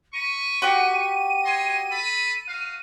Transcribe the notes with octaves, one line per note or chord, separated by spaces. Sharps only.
B5 C#6 D#7
F#4 G4
C#5 D#5 C6
A4 B5
F#4 F5